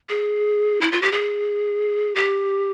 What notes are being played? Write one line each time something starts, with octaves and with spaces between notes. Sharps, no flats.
G#4
E4
F4
G4
G#4
G4